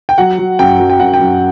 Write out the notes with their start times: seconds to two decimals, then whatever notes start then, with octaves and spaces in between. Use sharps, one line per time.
0.09 G5
0.18 F#3 F#5
0.38 F#3
0.59 F#2 G5
0.80 F#3
0.90 G5
1.00 F#2 F#5
1.14 G5
1.20 F#2